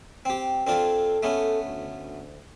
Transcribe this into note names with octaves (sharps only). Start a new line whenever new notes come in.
C4 G4
C4 D4 F4 A4
A3 B3 C#4
D2